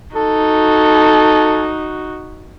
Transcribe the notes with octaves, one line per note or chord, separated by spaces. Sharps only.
D#4 F#4 A4